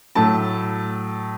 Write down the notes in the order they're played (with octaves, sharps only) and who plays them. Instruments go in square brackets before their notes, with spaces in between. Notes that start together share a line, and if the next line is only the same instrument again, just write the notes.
[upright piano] A2 F#3 A3 A5